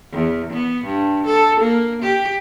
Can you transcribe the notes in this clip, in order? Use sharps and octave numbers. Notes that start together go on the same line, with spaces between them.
E2
B3
G2
A4
A#3
G4